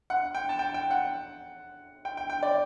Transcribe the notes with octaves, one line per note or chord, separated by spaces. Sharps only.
F#5
G5
A5
G5
G5
F#5
G5
G5
G5
D5